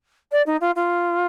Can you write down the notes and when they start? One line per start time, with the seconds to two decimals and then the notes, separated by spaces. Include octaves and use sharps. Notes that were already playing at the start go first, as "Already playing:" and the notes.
0.31 D5
0.46 D#4
0.61 F4
0.75 F4